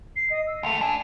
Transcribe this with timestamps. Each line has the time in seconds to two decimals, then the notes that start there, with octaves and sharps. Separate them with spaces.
0.16 C7
0.30 D#5
0.47 E6
0.63 C#2 A3 F7
0.81 D4 G#5